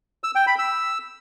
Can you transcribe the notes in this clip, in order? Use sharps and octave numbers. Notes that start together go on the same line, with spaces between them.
E6
G5
B5
E6